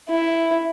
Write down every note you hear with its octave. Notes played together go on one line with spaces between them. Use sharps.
E4